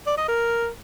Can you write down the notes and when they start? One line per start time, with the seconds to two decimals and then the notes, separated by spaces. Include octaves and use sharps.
0.06 D5
0.17 D#5
0.28 A#4